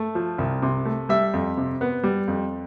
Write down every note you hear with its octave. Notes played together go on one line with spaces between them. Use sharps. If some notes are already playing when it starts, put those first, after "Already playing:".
Already playing: A3
F3
C2
C3
A3
G3 E5
F2
C3
B3
G3
F2